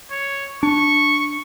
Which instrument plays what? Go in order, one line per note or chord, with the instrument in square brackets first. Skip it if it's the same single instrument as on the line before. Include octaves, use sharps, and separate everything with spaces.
[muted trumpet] C#5
[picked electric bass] D4 [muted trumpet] C#6